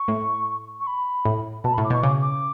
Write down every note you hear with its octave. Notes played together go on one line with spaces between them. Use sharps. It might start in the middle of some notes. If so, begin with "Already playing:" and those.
Already playing: C#6
A2
C#6
B5
A2
B2 A5
B5
A2
D6
B2 C#6
C#3 D6
D6